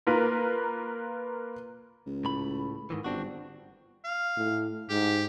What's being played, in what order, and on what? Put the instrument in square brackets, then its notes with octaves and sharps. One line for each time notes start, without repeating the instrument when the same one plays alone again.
[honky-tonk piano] A#3 F4 A#4 B4
[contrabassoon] C#2
[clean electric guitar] A2 B5
G#2 D#3 E3
[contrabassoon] G1 [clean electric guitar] C4 D4 F#4
[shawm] F5
[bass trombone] A2
[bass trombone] G#2 [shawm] G4